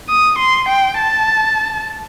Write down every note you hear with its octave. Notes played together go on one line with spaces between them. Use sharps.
D#6
C6
G5
A5